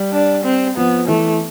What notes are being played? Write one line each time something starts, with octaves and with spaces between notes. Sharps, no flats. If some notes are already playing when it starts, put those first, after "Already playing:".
Already playing: G3
D4
C4
F3 B3
E3 A3